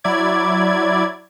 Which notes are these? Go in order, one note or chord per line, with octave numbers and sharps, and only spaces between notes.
F#3 E4 D5 G#6